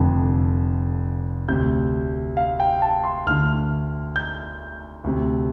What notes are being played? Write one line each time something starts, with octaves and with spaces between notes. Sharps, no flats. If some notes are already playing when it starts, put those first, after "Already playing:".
Already playing: F1 F2 D3
D2 C3 G6
F5
G5
A5
C6
D2 D3 F6
G6
D2 C3